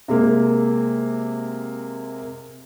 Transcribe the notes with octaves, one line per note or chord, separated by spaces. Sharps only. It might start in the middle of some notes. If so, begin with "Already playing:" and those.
C3 G#3 A#3